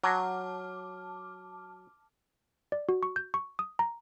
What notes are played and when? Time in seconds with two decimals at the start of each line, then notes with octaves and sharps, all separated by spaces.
0.04 F#3 A5 D6 F6
2.72 D5
2.89 F#4
3.03 C#6
3.16 G6
3.34 C#6
3.59 D#6
3.79 A#5